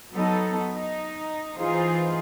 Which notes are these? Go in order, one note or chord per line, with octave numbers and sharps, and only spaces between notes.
F#3 B3 D#4 A4
D#4
E3 D#4 F4 G#4 C5